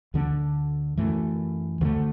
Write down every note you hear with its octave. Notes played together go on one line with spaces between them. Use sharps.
D2 D3 F#3 D4
F#2 E3 A3
D2 D3 F#3 A3